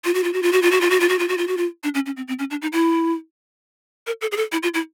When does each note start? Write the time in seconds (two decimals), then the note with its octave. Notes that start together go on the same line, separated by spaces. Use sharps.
0.05 F4
0.14 F#4
0.24 F4
0.33 F#4
0.42 F4
0.52 F#4
0.62 F4
0.71 F#4
0.81 F4
0.90 F#4
1.00 F4
1.09 F#4
1.19 F4
1.29 F#4
1.38 F4
1.48 F#4
1.57 F4
1.83 D4
1.95 C#4
2.06 C#4
2.17 C4
2.28 C4
2.39 C#4
2.51 D4
2.62 D#4
2.73 E4
4.07 A#4
4.21 A4
4.32 G#4
4.37 A4
4.52 E4
4.63 F4
4.74 E4